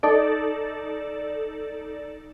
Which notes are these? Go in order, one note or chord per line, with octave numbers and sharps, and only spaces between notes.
D#4 A4 D5